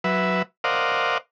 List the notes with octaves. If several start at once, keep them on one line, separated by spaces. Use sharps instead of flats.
F#3 B4 E5
A#4 C5 D5 D#5 F5 F#5